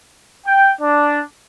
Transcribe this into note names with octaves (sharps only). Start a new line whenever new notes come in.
G5
D4